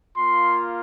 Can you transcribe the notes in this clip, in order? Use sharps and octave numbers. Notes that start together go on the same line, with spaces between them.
A#3 F4 C6